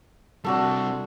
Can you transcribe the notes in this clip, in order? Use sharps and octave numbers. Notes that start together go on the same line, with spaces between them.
C3 G3 D4 F#4 A4